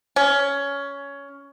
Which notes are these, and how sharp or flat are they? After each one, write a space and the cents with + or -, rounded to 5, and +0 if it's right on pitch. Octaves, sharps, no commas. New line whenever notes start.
C#4 +15